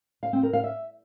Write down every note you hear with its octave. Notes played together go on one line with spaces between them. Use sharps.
F5
C4
A#4
F5
E5